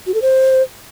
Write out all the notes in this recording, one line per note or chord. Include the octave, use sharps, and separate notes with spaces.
F#4
A4
C5